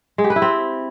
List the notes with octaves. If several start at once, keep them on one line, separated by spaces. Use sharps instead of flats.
G#3
G4
B4
E4
C4